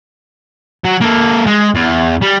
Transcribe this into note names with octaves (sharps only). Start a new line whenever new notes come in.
F#3
A#3 A4
G#3
E2
G3